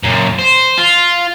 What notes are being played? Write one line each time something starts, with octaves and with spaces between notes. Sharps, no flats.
F#2 A#2
C5
F4